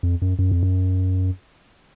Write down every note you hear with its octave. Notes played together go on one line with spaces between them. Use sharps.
F2
F#2
F#2
F2
F#2